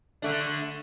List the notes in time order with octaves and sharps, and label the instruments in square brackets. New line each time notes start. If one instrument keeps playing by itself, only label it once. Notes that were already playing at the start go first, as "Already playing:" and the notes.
[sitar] D3 A3 D4